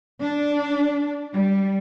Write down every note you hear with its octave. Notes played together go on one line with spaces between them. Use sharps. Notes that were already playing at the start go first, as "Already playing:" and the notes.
D4
G3